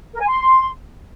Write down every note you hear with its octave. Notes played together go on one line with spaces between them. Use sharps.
A#4
G#5
C6